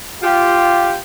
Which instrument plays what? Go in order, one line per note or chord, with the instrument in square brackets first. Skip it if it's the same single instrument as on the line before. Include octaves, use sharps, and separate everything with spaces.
[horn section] F4 G4